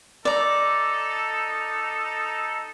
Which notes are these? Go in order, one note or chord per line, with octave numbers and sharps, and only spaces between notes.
D#4 A4 D5 A#5